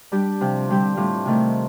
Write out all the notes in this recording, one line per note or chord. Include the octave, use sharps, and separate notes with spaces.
G3 D4 G4
C3 F3 C4
D3 G3 C4 G4
A2 G3 C4 F4
C3 D#3 A3 C4